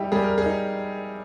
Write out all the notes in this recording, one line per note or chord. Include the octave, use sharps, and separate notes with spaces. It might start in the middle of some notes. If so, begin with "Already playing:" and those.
Already playing: G3 D#4 E4 G4
G3 G#4
A#4
G#4
D#4